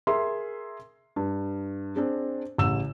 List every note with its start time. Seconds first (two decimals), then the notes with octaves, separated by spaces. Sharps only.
0.07 G#4 A#4 E5 C6
1.16 G2
1.96 C4 D4 G#4
2.58 A1 C#3 E6 E7